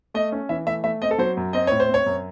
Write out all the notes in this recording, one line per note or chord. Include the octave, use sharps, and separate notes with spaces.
A3 D#5
C#4
E3 E5
A3 E5
A3 E5
C4 D#5
A4
F#3 C5
F#2
C4 D#5
A2 C#5
C5
C4
C#5
F#2